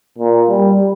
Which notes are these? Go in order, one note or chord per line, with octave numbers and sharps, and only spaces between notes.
A#2
G3